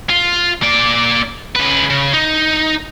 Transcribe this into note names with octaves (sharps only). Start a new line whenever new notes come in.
F4
A#3 D5
C#3 B4
C#3
D#4